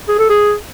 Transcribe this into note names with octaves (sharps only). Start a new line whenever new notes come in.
G#4
A4
G#4